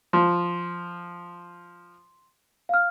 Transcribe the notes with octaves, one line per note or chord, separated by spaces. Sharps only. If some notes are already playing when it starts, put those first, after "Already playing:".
F3 C6
F5 F6